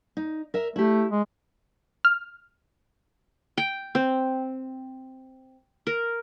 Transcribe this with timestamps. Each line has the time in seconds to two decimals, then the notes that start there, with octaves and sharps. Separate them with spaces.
0.17 D#4
0.54 A#4 E5
0.76 A3 E4 G4
1.11 G#3
2.05 F6
3.58 G5
3.95 C4
5.87 A#4